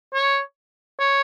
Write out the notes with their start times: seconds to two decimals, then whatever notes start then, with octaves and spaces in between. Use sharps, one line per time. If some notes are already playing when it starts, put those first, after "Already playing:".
0.14 C#5
0.99 C#5